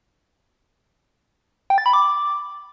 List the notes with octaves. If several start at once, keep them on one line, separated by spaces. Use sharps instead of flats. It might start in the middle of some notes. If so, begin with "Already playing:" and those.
G5
A6
B5
D6